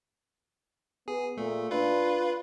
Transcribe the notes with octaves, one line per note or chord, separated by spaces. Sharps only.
B3 G#4
A#2 A3
D4 F4 B4